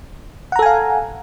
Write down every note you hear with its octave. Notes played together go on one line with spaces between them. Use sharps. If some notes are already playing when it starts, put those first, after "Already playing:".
A4 F5 F#5 G#5 A#5